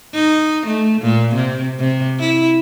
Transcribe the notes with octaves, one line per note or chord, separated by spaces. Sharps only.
D#4
A3
A#2
C3
C3
E4